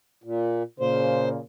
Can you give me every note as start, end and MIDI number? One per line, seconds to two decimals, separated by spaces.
0.24 0.63 46
0.80 1.38 46
0.80 1.38 49
0.80 1.29 72